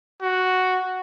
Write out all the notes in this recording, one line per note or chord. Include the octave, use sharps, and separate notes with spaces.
F#4